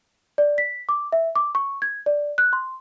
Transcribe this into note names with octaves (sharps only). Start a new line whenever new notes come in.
D5
B6
D6
E5
D6
C#6
G#6
D5
F#6
C6